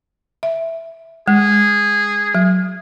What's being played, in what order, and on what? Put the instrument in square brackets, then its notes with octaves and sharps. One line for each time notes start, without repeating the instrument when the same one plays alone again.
[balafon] E5
[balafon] G#3 [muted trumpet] G#4
[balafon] F#3